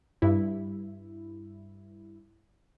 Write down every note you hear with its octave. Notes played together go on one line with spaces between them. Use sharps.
G2 E4